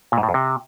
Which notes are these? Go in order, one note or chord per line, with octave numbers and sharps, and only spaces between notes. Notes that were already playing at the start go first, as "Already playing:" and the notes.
A#2
G#2
A2
F2
C3